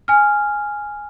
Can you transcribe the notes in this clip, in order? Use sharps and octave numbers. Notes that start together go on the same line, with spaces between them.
G#5 F6